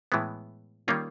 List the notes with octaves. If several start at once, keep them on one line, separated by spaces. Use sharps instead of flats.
A2 E3 G#3 B3
D#3 G3 A#3 C#4 F4